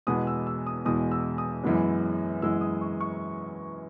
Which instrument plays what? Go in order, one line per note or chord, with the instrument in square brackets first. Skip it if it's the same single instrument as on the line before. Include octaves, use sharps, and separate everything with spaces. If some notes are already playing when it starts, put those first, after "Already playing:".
[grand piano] E2 B2 G#3 B3 D#6
E6
E6
D#6
E2 B2 G#3 B3 D#6
E6
D#6
F#2 E3 G#3 B3
F#2 E3 G#3 B3 E6
D#6
C#6
C#6